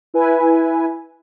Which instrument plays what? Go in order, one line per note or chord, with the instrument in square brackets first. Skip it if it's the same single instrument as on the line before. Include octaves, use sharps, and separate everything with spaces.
[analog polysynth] E4 B4 G#5